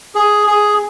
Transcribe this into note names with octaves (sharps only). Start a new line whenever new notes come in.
G#4
G#4